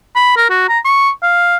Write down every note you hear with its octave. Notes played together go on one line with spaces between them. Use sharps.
B5
A#4
F#4
A#5
C#6
F5